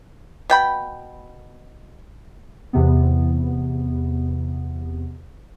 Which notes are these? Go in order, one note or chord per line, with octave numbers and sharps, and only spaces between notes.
B2 G5 B5
E2 C3 B3